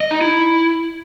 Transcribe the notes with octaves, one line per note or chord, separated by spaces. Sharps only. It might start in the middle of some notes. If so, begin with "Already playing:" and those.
D#5
D#4
E4